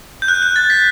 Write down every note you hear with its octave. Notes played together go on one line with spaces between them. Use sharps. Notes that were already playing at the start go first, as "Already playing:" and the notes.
G6
F#6
F#6
A6
B6